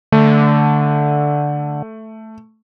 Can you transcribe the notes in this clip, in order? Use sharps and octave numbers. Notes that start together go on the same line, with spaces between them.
D3 A3